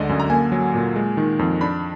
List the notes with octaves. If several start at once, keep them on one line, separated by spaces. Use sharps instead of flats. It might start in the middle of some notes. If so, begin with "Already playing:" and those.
Already playing: D2 D3 G#3 D5 D#5
F#2
A#5
A#3 G#5
F#3
A#2
G#3
D#3
F2
D4 B5